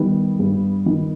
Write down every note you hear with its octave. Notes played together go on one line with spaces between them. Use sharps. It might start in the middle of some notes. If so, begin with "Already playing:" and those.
Already playing: D#3 G3 B3
G2
D#3